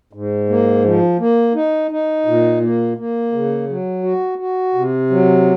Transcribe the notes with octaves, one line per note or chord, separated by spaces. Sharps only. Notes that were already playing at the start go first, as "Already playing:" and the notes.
G#2
A#3
F3
A#3
D#4
D#4
A#2
A#3
A#3
C#3
F#3
F#4
F#4
C3
F#3